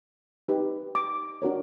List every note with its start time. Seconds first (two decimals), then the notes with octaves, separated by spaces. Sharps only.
0.48 D#4 G4 B4
0.95 D6
1.42 D4 F#4 A#4 C#5